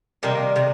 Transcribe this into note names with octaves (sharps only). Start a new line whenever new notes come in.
C3 D#3 G3 A#3
C3 D#3